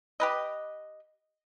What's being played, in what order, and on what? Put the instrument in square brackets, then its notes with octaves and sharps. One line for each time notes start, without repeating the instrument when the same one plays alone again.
[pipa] G4 B4 D#5